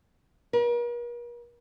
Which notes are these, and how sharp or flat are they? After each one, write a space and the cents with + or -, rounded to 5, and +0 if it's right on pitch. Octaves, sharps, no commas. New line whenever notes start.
A#4 +45